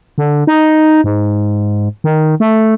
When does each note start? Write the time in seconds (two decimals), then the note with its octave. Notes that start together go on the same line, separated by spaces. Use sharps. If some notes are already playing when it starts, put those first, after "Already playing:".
0.18 D3
0.47 D#4
1.04 G#2
2.04 D#3
2.40 A3